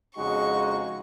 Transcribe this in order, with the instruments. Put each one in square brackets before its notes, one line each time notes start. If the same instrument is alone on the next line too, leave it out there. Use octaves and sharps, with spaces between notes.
[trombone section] F2 C#3 G#3 D#4 F#4 [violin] C#6